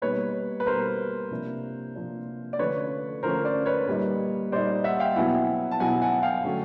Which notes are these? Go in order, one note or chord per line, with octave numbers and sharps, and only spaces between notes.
B2 G3 A#3 D#4 B4 C#5
B4
B2 G3 A#3 D#4 A#4 C5
C3 F3 A#3 D4
C3 F3 A#3 D4
D5
D3 F3 A3 C#4 B4 C#5
D3 F3 A3 C#4 A#4 C5
C5 D5
B4 C#5
A#2 G3 A#3 D#4
A#2 G3 A#3 D#4 C5 D5
E5 F#5
F5 G5
B2 F#3 B3 E4 F#5 G#5
A5
B2 F#3 B3 E4 F#5 G#5
F#5 G#5
F5 G5
D3 F#3 A3 C#4